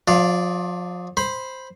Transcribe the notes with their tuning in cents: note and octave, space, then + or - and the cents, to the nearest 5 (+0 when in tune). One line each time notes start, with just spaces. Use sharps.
F3 +35 D5 +0 F5 -20
C5 +0 B5 +0